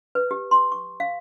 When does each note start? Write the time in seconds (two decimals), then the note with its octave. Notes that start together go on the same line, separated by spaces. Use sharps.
0.15 B4
0.31 G4
0.51 C6
0.72 C#6
1.00 F5